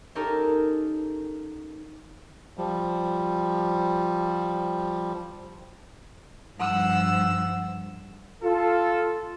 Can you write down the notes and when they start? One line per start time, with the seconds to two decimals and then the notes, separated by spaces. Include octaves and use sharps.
0.15 C#4 D#4 G4 A4 A#4
2.58 F3 G3
6.60 G2 F3 F#5 E6
8.43 F4 A4